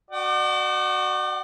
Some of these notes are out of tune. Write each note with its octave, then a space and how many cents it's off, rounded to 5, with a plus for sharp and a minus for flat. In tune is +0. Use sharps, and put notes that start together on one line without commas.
F#4 +0 D5 +40 G5 -45